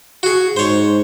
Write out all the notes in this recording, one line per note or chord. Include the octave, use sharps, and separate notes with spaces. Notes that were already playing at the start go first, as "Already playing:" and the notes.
F#4 G#4
G#2 C5 C#5